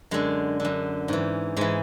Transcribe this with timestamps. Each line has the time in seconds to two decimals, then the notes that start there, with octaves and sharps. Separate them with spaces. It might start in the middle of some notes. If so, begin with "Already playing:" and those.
0.11 F#2 D3 G#3
0.60 D3
0.65 F#2
1.08 G#2 E3
1.57 G#2 E3 G#3